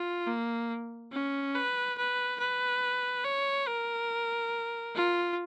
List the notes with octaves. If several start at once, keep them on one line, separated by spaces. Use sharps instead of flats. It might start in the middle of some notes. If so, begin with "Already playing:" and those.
Already playing: F4
A#3
C#4
B4
B4
B4
C#5
A#4
F4